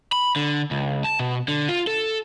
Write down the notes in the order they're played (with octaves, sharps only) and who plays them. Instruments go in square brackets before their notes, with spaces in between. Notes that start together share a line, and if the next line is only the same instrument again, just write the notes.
[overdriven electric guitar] B5
D3
C#2
A5
B2
D3
F4
A4